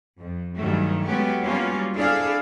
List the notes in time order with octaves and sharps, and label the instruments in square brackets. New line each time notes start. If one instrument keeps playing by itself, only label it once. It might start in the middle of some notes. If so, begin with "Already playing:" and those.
[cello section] F2
G2 D#3 E3 F#3 A3
F#3 G#3 A3 B3 C#4 G4
F#3 G3 A#3 B3 C#4 F4
C4 D4 E4 G#4 A4 F5